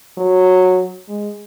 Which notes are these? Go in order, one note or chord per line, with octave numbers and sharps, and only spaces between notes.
F#3
G#3